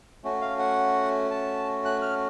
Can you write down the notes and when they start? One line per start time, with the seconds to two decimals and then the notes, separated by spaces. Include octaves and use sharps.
0.24 A3 C#4 F#4
0.41 F5
0.59 F#5
1.30 A5
1.85 F#6
2.02 F6